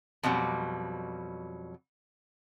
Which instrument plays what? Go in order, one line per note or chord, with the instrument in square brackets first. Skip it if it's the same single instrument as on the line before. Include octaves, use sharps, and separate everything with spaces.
[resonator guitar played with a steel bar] F2 B2 F#3 G3